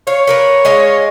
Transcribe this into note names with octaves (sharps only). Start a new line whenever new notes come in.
C#5 F5
A#3 A#4 B4
G#3 D#5 F5